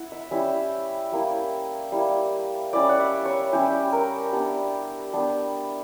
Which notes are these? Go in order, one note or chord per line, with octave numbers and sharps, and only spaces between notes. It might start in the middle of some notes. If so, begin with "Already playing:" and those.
Already playing: E4 F#5
E5
G3 C#4 E4 E5
G3 A#3 E4
G3 A#3 E4
G3 C#4 E4 D5
F#5
E5
C#5
G3 C#4 E4 G4
A#4
G3 B3 D4
G3 B3 D4